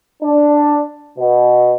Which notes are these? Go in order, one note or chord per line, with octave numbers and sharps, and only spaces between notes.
D4
B2